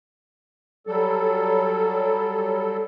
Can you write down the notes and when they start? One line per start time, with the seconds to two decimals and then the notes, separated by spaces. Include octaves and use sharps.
0.87 F#3 G3 A4